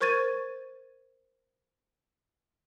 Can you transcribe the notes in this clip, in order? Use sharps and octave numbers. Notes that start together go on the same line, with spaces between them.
A#4 C5 C#6 G#6 A6 D#7